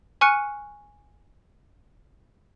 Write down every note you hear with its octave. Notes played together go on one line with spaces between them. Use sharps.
G#5 C#6 F6 F#6 C#7 D#7